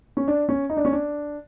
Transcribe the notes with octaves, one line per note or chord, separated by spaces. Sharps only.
C#4
D4
C#4
D#4
D4
C#4
D4